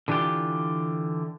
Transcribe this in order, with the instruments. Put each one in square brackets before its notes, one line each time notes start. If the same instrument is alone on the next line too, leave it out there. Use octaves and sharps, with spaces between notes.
[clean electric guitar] D3 E3 D4 F4 G4